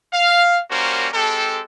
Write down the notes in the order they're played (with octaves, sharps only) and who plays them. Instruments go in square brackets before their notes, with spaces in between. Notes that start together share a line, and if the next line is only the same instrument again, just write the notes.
[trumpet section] F5
G3 A#3 C#4 F#4 A#4 C5
G#3 C4 G4 A4